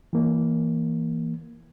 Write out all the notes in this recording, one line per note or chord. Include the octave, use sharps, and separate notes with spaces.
E3 A#3